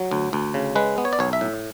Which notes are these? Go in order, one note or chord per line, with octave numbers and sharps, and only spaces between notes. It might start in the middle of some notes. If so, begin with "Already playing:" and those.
Already playing: F#3
D2
D2
C#3
G#3 B4
B3
C#5
D5
B1 C#5
E5
A2